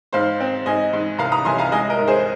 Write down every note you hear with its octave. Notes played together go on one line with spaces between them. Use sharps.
G#2 C5 F5
C4
G#2 D#5 G#5
G#2
C2 F5 A#5
A#5 D#6
C2 G#5 C6
F5 A#5
G#3 D#5 G#5
A#4 D#5
G#2
G#4 C5